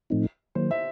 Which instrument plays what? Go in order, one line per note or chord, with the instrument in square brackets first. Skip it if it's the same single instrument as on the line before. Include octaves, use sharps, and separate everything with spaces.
[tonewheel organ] A2 F3 A3 C4 D#4
[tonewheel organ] D#3 F#3 A#3 [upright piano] C5
[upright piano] E5